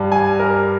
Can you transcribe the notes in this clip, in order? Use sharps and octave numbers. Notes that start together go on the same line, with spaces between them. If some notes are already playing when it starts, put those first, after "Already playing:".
Already playing: G2 G3
G#5
A#4